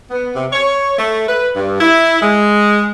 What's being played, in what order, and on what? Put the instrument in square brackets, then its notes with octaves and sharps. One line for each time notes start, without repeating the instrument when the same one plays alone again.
[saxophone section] B3
C3
C#5
A3
B4
G2
E4
G#3